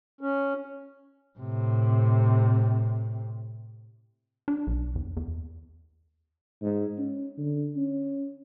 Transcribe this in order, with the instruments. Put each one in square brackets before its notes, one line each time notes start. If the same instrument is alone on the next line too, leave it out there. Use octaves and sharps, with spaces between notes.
[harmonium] C#4
[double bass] A2 C3
[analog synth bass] D4
B1
E2
E2
[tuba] G#2
C#4
D3
C#4